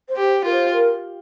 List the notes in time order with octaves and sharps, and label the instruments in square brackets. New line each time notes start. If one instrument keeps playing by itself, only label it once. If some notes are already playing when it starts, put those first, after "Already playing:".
[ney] C5
[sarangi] G4
[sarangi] F4 [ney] A#4
[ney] C5
A#4